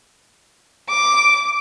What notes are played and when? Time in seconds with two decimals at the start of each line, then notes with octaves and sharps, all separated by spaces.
0.89 D6